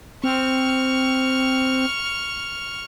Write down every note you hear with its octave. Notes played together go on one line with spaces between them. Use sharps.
C4 C#6 F6